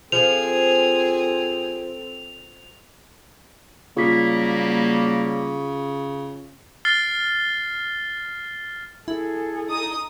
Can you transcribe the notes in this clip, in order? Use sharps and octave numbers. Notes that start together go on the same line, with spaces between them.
F3 C4 G#4 A4 F7
C#3 F#3 G3 A#3 F4 B6
F6 A6 C7 G7
E4 G#4 A4
D#4 D#6